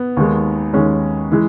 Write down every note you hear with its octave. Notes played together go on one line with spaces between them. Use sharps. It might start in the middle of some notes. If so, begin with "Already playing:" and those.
Already playing: B3
D#2 D#3 G#3
D#2 D#3 G#3 C#4
E3 G#3